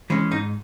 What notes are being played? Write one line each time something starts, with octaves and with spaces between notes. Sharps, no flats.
E3 G#3 C#4
G#2 D#4